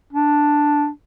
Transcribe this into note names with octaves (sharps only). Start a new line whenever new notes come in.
D4